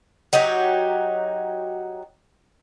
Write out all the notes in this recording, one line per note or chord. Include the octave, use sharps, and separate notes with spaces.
F#3 D#4 F#4 G4